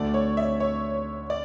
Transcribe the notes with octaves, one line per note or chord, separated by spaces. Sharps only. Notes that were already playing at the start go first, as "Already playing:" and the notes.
Already playing: D2 D3 A3 D5
C#5
E5
C#5
D5